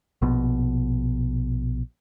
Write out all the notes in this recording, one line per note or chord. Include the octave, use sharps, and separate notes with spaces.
A#1 B2